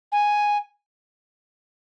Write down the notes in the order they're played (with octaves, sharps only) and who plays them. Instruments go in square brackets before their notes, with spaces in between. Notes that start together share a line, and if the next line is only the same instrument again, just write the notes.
[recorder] G#5